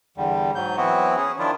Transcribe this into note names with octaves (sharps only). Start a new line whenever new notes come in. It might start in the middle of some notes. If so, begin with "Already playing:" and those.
E2 D3 G3
G#2 F#3 G6
E3 F#3 B3 C4 E4 F#4
C#4 G#4
D#3 F3 D4 E4 F4